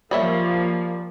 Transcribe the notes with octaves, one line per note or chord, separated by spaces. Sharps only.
F3 G3 A#3 C#5 E5